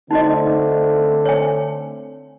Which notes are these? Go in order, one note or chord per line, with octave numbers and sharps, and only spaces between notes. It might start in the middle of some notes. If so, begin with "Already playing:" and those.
D3 A3 C4 D#4 F#4 D#5
C#5 G#5